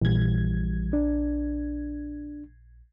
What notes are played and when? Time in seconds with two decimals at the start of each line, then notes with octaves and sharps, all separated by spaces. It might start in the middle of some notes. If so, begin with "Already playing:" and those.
0.02 A#1 E3 G3 G#6
0.93 D4